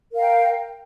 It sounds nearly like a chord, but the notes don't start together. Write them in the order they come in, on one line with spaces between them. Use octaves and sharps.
A#4 F5 G5